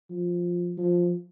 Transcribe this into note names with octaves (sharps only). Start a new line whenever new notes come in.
F3
F3